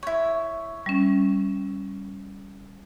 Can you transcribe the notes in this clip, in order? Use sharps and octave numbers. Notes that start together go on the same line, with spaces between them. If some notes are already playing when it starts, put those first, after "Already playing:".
E4 C#5
G3 C#4